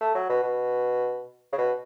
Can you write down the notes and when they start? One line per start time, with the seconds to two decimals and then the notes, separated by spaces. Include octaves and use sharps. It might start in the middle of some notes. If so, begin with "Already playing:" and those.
0.01 A3
0.15 F#3
0.30 B2
0.43 B2
1.52 C#3
1.58 B2